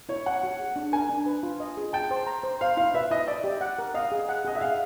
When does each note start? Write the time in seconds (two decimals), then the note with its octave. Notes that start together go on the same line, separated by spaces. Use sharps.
0.09 E4 C#5
0.26 C#5 F#5
0.43 F#4
0.59 G#4
0.76 D4
0.93 A#4 G#5
1.10 D4
1.26 B4
1.43 F4
1.60 D#5
1.77 G#4
1.93 G5 A5
2.11 C5
2.27 A#5
2.44 C5
2.61 C5 F5
2.77 E4 F5
2.94 B4 E5
3.11 E4 D#5
3.27 D5 E5
3.44 G4
3.61 F#5
3.79 A#4
3.94 D#5 F5
4.12 G#4
4.29 F#5
4.45 G#4 D#5
4.55 E5
4.61 F5 F#5